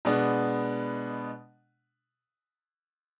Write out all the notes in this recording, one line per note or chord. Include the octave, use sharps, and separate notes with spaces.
B2 G#3 B3 D4